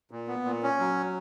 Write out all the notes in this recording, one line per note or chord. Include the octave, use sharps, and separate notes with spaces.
A#2
B3
A#2
C#4
F#3